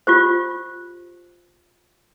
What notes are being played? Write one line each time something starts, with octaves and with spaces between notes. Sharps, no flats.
F4 G4 C5